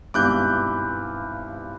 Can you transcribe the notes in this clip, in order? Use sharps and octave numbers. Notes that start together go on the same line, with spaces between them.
G#1 G2 B2 E3 D6 F#6 G6